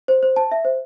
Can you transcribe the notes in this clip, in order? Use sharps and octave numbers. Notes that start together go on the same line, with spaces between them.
C5
C5
A5
E5
C5